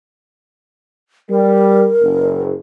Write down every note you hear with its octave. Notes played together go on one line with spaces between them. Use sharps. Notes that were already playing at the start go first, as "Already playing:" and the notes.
G3 A#4
F#1